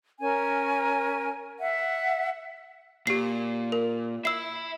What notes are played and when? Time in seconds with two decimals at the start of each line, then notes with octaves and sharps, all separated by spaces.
0.19 C#4 A#4 G#5
1.59 E5 F#5
3.07 A#2 G4 C7
3.72 A#4
4.25 E5 B5 E6 C7